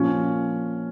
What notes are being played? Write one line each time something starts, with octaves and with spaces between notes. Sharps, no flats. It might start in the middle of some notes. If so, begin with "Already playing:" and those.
Already playing: A#2 F3 C#4